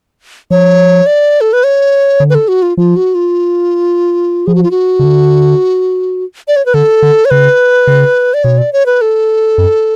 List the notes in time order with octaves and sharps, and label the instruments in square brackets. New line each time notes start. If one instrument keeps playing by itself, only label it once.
[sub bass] F3 [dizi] C#5
[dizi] D5
A4
B4
C#5
[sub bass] D3
[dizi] B4
A4
F#4
F4
[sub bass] F3 [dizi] F4
[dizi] F#4
F4
[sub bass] F3 [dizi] G#4
[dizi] F#4
F4
F#4
[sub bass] C#3
D3
[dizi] D5
C#5
B4
[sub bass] D3 [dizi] A4
[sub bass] D3
[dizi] C#5
[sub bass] C#3 [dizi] B4
[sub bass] C#3
[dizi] D5
[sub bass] B2 [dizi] C#5
[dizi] D5
C#5
B4
A4
[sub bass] F#2